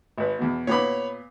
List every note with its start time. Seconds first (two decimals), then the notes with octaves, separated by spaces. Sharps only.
0.18 G#1 B4
0.39 E2 B2
0.67 A#2 B3 C#5 B5 D6